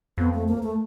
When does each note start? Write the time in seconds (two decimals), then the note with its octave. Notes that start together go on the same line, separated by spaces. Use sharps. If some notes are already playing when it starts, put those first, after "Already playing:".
0.18 F2 B3
0.33 A3
0.48 A#3
0.63 A3